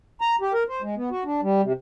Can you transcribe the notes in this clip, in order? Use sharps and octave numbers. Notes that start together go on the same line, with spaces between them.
A#5
G4
A#4
C5
G#3
B3
F#4
D4
G3
C3